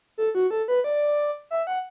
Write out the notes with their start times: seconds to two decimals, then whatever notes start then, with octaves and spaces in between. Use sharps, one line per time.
0.18 A4
0.35 F#4
0.51 A4
0.68 B4
0.84 D5
1.51 E5
1.67 F#5